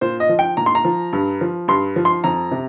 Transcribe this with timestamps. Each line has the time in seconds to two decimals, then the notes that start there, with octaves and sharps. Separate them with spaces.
0.01 A#2 C5
0.20 D#5
0.29 F3
0.39 G5
0.57 A#2 A#5
0.66 C6
0.75 A#5
0.85 F3
1.13 G2
1.41 F3
1.68 G2 C6
1.96 F3
2.05 C6
2.24 F2 A#5
2.51 C3